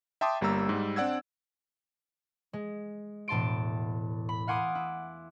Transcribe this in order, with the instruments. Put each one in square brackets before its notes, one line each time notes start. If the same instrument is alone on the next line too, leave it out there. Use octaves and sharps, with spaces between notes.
[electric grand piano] E5 G5 A5 C6 D6 D#6
G1 G3 A#3 A#5 E6
G#2 G3
C4 D4 D5 F#5 E6 G#6
[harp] G#3
E1 A2 A5 C6 D7
B5
F5 F#5 G#5 C6 D6 D#6
E4